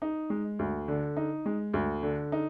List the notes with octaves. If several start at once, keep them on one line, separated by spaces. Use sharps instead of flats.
D#4
G#3
D2
D3
D#4
G#3
D2
D3
D#4